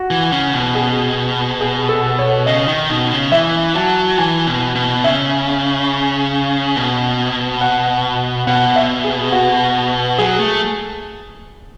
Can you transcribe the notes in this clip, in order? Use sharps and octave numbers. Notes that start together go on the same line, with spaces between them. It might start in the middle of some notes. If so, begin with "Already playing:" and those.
Already playing: F#4
E3
C#3
B2
G#4
G#4
A4
C#5
C#3 D#5
D#3
B2
C#3
E3 E5
F#3 A5
E3 G#5
B2
B2
C#3 E5
B2
F#5
B2 F#5
E5
G#4
F#4
F#3 G#4
A3